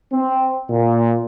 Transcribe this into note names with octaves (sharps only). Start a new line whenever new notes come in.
C4
A#2